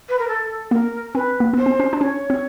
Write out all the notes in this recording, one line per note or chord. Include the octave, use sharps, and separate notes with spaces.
B4
A#4
A4
A#3 A#4
C4 B4
A#3
B3 C5
C4
C#4
D4
C#4 C#5
C4